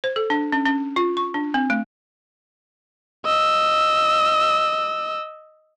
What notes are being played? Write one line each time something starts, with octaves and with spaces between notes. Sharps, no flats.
C5
A4
D4
C#4
C#4
F4
C#6
D4
C4
A3
D#5 E6